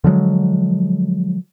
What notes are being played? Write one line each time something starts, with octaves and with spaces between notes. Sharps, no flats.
D3 F3 F#3 G#3